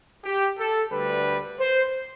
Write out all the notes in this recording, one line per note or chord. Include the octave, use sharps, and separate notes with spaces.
G4
A4
D2 D3 G3 B4
C5